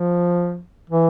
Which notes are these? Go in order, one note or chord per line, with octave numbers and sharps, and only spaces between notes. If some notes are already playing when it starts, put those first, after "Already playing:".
Already playing: F3
E3